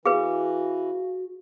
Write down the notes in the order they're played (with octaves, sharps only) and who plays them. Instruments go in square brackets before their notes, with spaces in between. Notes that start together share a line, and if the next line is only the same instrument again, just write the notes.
[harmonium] E3 [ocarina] F#4 [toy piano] G#4 B4 [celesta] F5